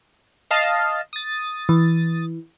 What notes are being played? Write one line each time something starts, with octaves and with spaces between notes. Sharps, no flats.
D#5 F5 A5
D#6 A6
E3